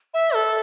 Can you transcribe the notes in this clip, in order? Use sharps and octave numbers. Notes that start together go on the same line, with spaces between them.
E5
A4